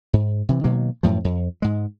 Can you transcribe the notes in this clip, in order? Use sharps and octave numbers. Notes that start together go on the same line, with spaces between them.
G#2
C3 E3
B2 D#3 F#3 A#3
F#2 A2 F3
F2
G#2 G#3